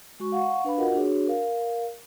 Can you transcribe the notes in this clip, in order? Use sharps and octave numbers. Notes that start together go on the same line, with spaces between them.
G#3 F#4 C#6
F5 F#5 C#6
D4 B4 F5 B5
F4 F#4 A#4 D#5 F#5
D4 F#4 G#4 C#5
A#4 F5